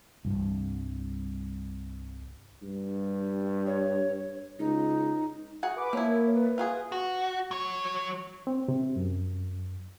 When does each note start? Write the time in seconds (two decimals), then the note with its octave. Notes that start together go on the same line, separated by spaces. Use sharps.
0.25 C2 G2
2.62 G2
3.67 C#5
4.59 C#2 D#4
5.63 F#4 G#4 F#5
5.76 B4 D6
5.93 F3 A#3 E4 C#5
6.34 B4
6.58 F4 F#4 G#4
6.92 F#4
7.51 F#3 C#5
8.47 C4
8.68 C3
8.96 F#2